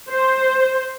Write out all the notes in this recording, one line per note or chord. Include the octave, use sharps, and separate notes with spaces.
C5